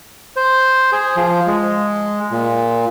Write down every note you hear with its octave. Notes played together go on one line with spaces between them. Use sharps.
C5
G#4
F3
G#3
A#2